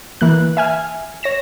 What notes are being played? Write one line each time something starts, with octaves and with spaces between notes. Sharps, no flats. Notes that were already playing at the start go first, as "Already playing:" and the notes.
E3 A#3 F#6
E5 G#5 F6
C#5 A#6 E7